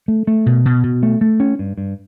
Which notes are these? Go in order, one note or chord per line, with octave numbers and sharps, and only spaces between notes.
A3
A3
B2
B2
B2
A3
A3
C#4
G2
G2